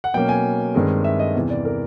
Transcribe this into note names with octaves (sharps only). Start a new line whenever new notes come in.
F#5
B2 F#3 A#3 C#4 G5
G#5
G2 D#3 G#3 C4
E5
D#5
E2 C3 E3
D5
A#4